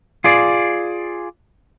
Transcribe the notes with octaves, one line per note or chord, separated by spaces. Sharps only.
F4 G#4 D5